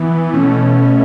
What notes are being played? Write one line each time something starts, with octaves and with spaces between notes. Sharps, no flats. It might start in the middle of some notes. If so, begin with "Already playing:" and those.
Already playing: E3 B3
B2 A3 C#4